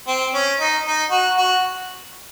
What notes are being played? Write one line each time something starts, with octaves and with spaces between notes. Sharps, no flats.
C4
C#4
D#4
D#4
F#4
F#4